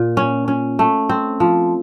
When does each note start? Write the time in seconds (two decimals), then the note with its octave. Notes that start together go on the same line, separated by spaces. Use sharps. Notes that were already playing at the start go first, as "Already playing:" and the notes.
Already playing: A#2
0.17 C#4
0.48 C#4
0.79 A3
1.09 C4
1.40 F3